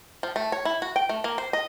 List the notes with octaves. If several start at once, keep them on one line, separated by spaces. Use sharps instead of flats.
F3
A3
C#5
E4
F#4
G5
A3
A#3
C5
D#5